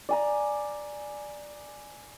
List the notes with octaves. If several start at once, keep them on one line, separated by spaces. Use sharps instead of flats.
D5 G#5 A#5